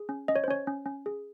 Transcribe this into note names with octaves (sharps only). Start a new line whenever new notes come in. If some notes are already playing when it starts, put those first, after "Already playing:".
Already playing: G#4
C#4
C#4 D#5
C#5
C5
C#4 C#5
C#4
C#4
G#4